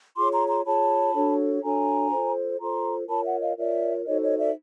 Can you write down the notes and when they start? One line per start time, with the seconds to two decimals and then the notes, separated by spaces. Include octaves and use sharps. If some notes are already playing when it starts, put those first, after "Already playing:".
0.16 F4 G#4 C#5 C6 D6
0.32 A#5 C6
0.48 A#5 C6
0.65 F4 G#4 C#5 A5 B5
1.13 D4 F#4 A4 C#5
1.62 D4 F#4 A4 C#5 G#5 A#5
2.11 F4 A4 C5
2.60 F4 A4 C5 A#5 C6
3.08 F4 A#4 C#5 A5 B5
3.25 E5 F#5
3.41 D#5 F5
3.57 F4 A#4 C#5 D5 E5
4.06 D#4 F#4 A4 C5 C#5 D#5
4.22 C#5 D#5
4.39 D5 E5